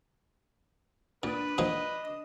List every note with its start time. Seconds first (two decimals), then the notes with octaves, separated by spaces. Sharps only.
1.23 A#2 D4 B4 D#6
1.58 A#2 F3 D#4 D#5